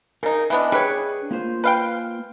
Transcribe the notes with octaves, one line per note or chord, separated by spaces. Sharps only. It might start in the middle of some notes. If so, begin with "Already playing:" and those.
C#3 D#4 A#4
E3 B3 D4 D#5 E5
G3 D4 G#4 B4 C#5
A#3 F4 C5
B4 F5 G5